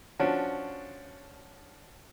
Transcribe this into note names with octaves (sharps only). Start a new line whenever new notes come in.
F3 C#4 D4 F#4